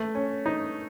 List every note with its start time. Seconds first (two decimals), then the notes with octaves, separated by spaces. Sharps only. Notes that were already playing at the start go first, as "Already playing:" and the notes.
Already playing: A3
0.15 C#4
0.46 D#4